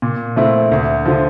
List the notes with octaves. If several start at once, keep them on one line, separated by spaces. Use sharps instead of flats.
A#2
F3 A3 C4 E4
D2
D3 F3